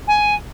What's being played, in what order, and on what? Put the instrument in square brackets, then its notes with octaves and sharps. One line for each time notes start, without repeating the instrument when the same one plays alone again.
[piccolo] G#5